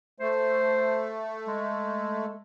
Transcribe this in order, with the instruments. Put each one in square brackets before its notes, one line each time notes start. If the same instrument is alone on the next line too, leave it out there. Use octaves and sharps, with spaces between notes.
[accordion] A3 [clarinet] C5
[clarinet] G#3